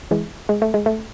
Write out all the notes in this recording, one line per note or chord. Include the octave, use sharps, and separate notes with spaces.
E3 G#3
G#3
A3
G#3
A3